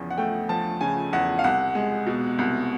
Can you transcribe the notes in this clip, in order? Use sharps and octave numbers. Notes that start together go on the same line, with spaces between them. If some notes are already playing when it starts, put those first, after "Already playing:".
Already playing: E2 C#3 F3
F#5
A3 G5
F3 A5
C#3 G#5
E2 F#5
F5
C2 F#5
G#3
B2
C2